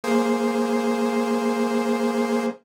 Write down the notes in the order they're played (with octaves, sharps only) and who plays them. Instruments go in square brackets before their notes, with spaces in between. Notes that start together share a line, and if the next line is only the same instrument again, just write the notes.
[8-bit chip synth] A#3 G#4 C5